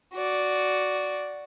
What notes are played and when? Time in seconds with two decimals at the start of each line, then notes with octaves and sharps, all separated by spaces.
0.14 F#4 D5